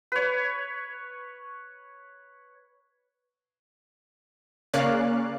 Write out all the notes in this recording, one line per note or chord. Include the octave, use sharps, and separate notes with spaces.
B4 C#5
C#3 A#3 C#4 D5 F5 F#6